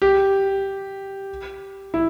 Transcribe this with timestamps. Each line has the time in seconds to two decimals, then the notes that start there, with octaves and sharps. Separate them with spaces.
0.02 G4
1.94 E4